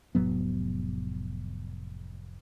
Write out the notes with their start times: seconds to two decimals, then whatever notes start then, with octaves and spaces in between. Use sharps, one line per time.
0.15 F1 A2 F#3 B3